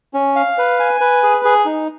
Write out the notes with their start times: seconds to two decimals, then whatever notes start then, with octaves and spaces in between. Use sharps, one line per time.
0.14 C#4
0.36 F5
0.58 B4
0.80 G#5
1.01 B4
1.23 G#4
1.45 G#4
1.66 D#4